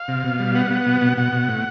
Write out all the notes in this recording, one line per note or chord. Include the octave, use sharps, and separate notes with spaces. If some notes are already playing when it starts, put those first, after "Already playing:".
Already playing: F5
C3
B2
G3
B3 F#5
B3
B2
B2
B2 F#5
B2
A2